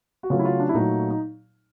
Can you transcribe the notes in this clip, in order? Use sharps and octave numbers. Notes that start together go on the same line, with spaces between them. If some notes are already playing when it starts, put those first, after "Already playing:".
F#4
C#3 F#3 A3 F4
E4
F4
D4
E4
A#2 F#3 A3 D#4
D#4